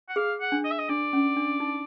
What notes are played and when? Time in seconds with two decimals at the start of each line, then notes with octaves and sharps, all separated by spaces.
0.09 F#5
0.16 G#4 F5
0.41 F#5
0.52 D4
0.65 D#5
0.71 E5
0.79 D#5
0.89 D4 D5
1.13 C#4
1.36 D4
1.60 D#4